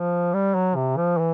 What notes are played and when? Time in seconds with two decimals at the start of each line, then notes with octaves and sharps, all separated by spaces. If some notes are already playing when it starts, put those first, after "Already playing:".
Already playing: F3
0.34 G3
0.55 F#3
0.75 C3
0.97 F3
1.18 E3